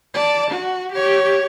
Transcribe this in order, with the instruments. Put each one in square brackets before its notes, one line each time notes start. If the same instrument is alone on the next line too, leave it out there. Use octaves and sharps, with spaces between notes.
[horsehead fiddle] D5 A5
F#4
G4 C#5